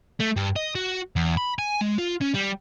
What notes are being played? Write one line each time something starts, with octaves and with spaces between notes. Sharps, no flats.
A3
G2
D#5
F#4
E2
B5
G#5
G#3
F4
C#4
G3